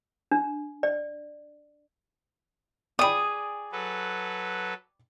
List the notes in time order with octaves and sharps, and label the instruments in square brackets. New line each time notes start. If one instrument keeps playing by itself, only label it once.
[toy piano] D4
D5
[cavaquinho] G#4 D#6 [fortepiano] D5 G5 B5
[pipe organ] F#3 A4 B4